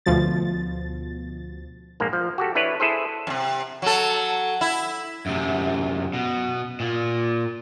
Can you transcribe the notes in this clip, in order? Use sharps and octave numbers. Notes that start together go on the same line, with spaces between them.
D2 B2 F3 A6
A#1 G#2 A#3
F3
F#4 G4 A4
D4 E4 B4 C#5
E4 G#4 A4 C5
F#2 C3
F#3 A4
E4
F#2 C3
B2
A#2